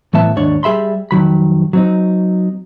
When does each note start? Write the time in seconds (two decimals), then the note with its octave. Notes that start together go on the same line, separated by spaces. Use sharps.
0.14 A2 E3 B3 E5 A5
0.36 D#2 G#2 D4 C#5 D5
0.63 G3 G#4 E5 B5 C6
1.11 F2 D#3 F#3 B5
1.73 F#3 C4 D#4